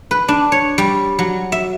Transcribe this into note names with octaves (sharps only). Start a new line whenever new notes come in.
B4
D4
C#5
G3
F#3
E5